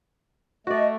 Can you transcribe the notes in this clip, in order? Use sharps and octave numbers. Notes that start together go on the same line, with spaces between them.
A3 F#4 D5 D#5